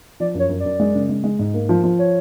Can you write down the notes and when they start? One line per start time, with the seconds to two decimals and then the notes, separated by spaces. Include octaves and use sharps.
0.20 F3 D5
0.34 F#2
0.39 C#5
0.49 F#2
0.60 F#2 D5
0.80 G#3
0.95 C#3
1.09 G#3
1.24 G#3
1.39 G#2
1.54 A#3
1.69 F3
1.84 F3
1.99 C#5